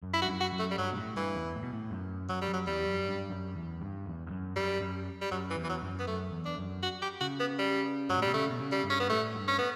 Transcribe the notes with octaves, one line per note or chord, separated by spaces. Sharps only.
F#2
E4
G2 F#4
F#2
F#4
F#2
A3
G3
G2 F#3
B2
A2
G2 E3
E2
A2
B2
A2
F#2
F#2 F#3
G3
F#2 F#3
E2 G3
F#2
G2
F#2
E2
G2
E2
E2
F#2
F#2 G3
F#2
G3
F#2 F#3
E3
E2
E3
F#3
F#2
B3
F#2 A3
E2
D4
F#2
F#4
G4
C#3 F#4
B3
G3
G2 F#3
A2
B2 G3
C#3 A3
B2
C#3
G3
G2
C#4
B3
A2 A3
G2
C#4
B3